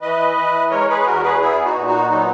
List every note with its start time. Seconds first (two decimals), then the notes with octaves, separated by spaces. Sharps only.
0.01 E3 B4 D#5
0.36 E3
0.70 G#3 A#4 C#5
0.89 G#4 B4
1.01 G#4
1.06 E2 F#4 A#4
1.23 G#4 B4
1.40 B3 E4 G#4
1.64 D#4 F#4
1.76 A#2
1.86 D#4 F#4
2.10 F#3 D#4